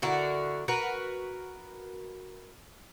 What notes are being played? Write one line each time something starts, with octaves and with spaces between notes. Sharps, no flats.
D3 E4 F#4 A#4
F#4 A#4 B4